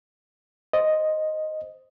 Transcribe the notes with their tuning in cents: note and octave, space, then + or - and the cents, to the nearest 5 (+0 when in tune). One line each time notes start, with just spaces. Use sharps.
C5 +0 D#5 +0